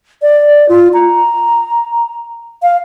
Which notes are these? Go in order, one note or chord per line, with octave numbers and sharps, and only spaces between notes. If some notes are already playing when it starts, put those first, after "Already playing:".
D5
F4
A#5
F5